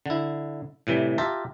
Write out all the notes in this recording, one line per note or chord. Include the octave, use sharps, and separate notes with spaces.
D3 E4
A2 C3 E3 G3
F4 G4 E5 A5 A#5